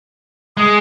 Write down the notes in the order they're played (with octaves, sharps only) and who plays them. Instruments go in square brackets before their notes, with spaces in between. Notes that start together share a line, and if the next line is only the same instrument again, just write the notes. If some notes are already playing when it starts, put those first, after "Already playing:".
[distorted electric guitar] G#3 [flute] D#6